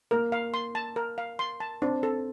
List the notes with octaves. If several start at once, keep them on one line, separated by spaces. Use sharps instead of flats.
A#3 A#4
F5
C6
A5
A#4
F5
C6
A5
C4 D4
A4